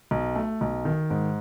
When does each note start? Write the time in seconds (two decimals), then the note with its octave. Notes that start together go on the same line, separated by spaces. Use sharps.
0.11 B1
0.36 A3
0.61 B1
0.85 D#3
1.10 G#2